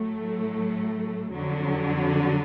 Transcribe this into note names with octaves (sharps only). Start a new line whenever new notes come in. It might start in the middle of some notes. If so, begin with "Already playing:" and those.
Already playing: A2 F#3 A3
F2 D3 F#3